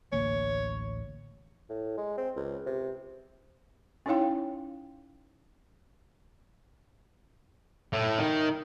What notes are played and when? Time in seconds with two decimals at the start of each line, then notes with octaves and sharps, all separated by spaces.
0.12 A1 D2 A#3 C#5
1.69 A2
1.97 G#3
2.18 C4
2.36 C#2
2.66 C3
4.06 C#4 D#4 E4 C#5 F5 G5
7.93 A2
8.18 D#3